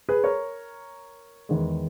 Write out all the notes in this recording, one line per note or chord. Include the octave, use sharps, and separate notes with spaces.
G#4 B4
A#4 C#5
E2 D#3 G#3